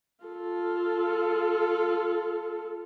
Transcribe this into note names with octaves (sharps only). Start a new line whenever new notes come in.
F4 A4